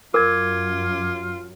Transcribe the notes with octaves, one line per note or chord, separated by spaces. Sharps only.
F#2 F4 A#4 D6 G#6